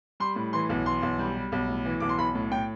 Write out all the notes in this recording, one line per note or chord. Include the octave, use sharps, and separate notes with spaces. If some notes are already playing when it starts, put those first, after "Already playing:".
G3 C6
A2
E3 C6
B1
E3 C6
B1
G3
G3
B1
A2
E3
B1 D6
C6
B1 B5
A2
A2 G5